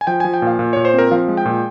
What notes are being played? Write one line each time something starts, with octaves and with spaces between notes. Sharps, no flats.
G#5
F3 G5
F3 G#5
G5
A#2 F5
A#2
A#2 C#5
C5
C4 A#4
F3 F5
G#3
G5
A#2